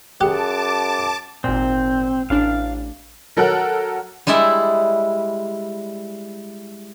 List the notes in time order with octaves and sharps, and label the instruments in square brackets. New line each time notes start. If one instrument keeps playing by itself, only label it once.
[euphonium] F#2 [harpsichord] G4 [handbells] G#4 F#6 [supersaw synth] A5 D6
[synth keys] G#1 A#2 [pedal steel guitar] C4
[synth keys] A1 D4 [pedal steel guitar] F5
[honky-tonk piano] F#3 A4 A#4 F#5 F#6
[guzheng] G3 G#3 E4 D5 E5